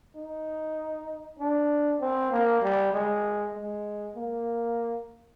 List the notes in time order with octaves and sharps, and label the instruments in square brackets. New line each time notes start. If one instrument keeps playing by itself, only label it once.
[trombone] D#4
D4
C4
A#3
G3
G#3
G#3
A#3